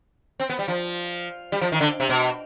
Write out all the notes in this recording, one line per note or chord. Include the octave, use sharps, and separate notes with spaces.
C4
B3
G3
F3
G3
F3
D#3
D3
C3
B2